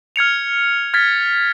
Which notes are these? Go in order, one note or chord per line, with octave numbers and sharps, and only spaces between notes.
F6 G#6 C#7 F7
F6 G#6 A6 B6